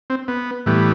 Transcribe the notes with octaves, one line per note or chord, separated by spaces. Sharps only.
C4
B3
A2 E3 G3 B3